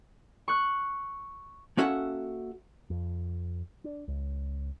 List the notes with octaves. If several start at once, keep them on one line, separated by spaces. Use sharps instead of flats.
C#6 F#6
A#3 C#4 F#4 A4 E5 F#5
F2
D4
C#2